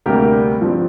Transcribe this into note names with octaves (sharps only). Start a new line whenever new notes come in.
D2 C3 G3 A#3 G4 A#4
G2 F3 C4